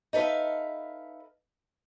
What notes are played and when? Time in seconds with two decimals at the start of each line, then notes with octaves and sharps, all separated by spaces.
0.13 D#4 A4 B4 E5 F5